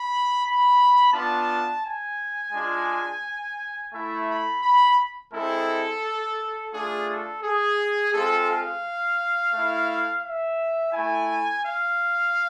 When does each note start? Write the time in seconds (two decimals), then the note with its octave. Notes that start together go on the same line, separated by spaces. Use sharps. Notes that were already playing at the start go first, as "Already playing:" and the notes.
Already playing: B5
0.43 B5
1.12 B3 D4 F4 A5
1.83 G#5
2.53 G#3 D4 F4
3.93 A3 E4 E5
4.28 B5
4.63 B5
5.32 G#3 C4 E4 A4
6.73 A3 D4 F4 G#4
7.09 A4
7.43 G#4
8.13 G#3 C4 F4 A4
8.48 F5
9.54 A3 E4
10.23 E5
10.93 A3 E4 G#5
11.63 F5